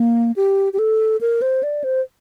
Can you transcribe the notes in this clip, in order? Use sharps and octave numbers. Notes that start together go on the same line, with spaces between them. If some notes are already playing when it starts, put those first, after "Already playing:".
Already playing: A#3
G4
G4
A4
A#4
C5
D5
C5